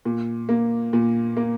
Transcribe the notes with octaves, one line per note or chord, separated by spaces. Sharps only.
A#2
A#3
A#2
A#3